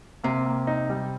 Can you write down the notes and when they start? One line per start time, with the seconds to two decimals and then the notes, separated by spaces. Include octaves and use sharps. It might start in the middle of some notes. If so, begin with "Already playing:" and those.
0.24 C3 A#3
0.46 A#3
0.67 D#4
0.90 G3